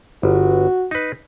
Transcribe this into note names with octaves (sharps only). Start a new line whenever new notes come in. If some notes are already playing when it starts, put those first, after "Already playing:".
G1 F#4
D#4 B4